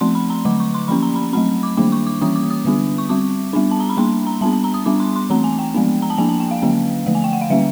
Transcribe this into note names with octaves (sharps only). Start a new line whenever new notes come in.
F3 A3 C4 C6
B5
A#5
D3 F#3 A3 D6
C#6
C6
F3 A#3 C#4 B5
A#5
B5
F#3 A3 C4 B5
D6
D#3 G3 A#3 D4 D6
C#6
D6
E3 G3 A#3 C#4 D#6
D6
D#6
D3 G3 B3 D4
C#6
G3 C4 D6
G3 B3 D4
A5
A#5
B5
G3 A#3 D4 C6
A#5
G3 B3 D4 A5
A5
A#5
D#6
G3 B3 D4 D6
C6
C6
E3 A3 C4 A#5
G#5
G5
F3 G#3 B3 D4
A#5
A5
F3 A#3 D4 G#5
A5
G5
F5
D3 F#3 A#3 C#4
D3 F3 A3
G#5
G5
F#5
F5
D3 G3 A#3 C#4 E5